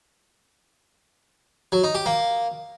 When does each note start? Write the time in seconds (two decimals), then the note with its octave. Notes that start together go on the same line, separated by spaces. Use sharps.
1.72 F#3
1.84 D#4
1.95 G4
2.06 A#3